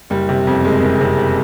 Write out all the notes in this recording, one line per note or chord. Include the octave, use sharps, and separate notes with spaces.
F#1 G3
C3
F2
F#1 G#3
F#1
C3